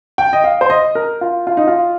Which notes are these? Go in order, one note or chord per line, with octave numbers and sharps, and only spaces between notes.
G5
D#5
F5
C5
D#5
A#4
F4
F4
D#4
F4